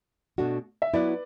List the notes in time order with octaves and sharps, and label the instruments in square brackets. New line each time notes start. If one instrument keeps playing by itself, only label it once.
[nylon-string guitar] B2 A3 D4 F#4
[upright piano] E5
[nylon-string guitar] F#3 B3 E4 [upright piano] B4 D5